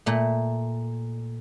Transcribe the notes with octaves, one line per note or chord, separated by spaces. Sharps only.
A#2 A3